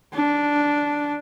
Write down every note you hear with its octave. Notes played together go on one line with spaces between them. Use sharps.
D4